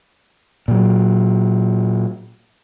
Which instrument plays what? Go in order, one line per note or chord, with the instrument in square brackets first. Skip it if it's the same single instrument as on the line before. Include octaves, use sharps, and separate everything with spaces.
[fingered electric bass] A#2 F#3